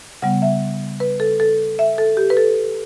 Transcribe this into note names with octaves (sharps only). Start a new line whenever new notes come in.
C#3 G3 B3 F#5
E5
B4
A4
A4
E5
A4
G4
B4
A4